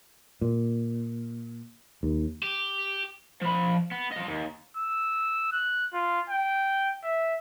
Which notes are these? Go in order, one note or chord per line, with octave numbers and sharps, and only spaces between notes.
A#2
D#2
G4
F3 B5
B3
F3 D#5
D#2
E6
F#6
F4
G5
E5